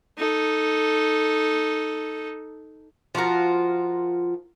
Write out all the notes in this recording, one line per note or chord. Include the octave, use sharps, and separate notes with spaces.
D#4 A4
F3 F4 F#4 A#4